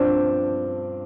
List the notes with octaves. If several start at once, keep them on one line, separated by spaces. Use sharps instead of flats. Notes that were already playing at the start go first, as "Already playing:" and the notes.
Already playing: G2 F3 C4 D4